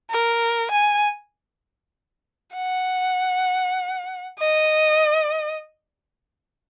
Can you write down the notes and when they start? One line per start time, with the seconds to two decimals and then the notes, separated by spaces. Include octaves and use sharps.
0.11 A#4
0.72 G#5
2.56 F#5
4.39 D#5